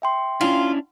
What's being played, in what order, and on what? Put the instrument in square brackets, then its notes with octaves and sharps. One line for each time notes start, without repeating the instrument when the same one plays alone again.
[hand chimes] E5 G5 C6
[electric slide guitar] C#4 D4 E4 [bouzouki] F4